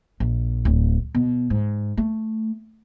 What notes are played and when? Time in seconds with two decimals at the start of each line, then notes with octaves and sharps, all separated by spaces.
0.20 A#1
0.65 D1
1.15 B2
1.50 G#2
1.97 A3